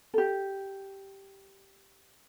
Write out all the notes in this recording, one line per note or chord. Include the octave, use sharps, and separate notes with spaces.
G4 A4